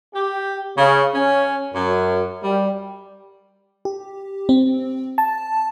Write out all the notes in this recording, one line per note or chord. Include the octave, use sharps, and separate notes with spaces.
G4
C#3
C#4
F#2
G3
G4
C4
A5